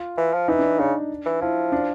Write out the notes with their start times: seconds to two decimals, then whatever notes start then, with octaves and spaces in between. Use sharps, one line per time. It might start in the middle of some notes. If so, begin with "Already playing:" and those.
Already playing: F4
0.18 E3
0.33 F3
0.48 E3 D#4
0.59 D4
0.79 C#3 D4
1.26 E3
1.41 F3 E4
1.72 D4